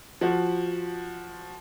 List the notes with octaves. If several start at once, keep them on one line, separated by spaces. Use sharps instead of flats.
F3 F#4